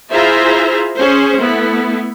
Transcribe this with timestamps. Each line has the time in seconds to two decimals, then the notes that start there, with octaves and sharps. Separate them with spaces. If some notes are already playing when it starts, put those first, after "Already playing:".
0.12 E4 F4 G#4 C5 E5 A#5
0.96 C#4 G#4 C5
1.40 A3 B3 E4